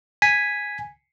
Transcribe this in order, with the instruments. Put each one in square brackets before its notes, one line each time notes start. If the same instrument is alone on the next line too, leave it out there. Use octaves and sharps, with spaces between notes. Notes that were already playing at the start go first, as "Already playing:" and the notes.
[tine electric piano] G#5 B6